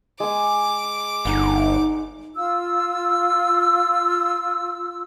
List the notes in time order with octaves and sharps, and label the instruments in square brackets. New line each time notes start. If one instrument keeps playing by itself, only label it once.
[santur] G#3 G#5 [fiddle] D6
[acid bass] G1 [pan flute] D#4 [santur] F#5
[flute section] F4 E6